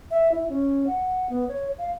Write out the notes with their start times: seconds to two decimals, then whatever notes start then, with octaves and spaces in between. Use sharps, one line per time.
0.11 E5
0.32 E4
0.49 C#4
0.87 F#5
1.30 B3
1.49 C#5
1.78 F5